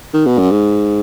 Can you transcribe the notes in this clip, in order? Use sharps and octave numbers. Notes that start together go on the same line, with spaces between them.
D#3
B2
F#2
G#2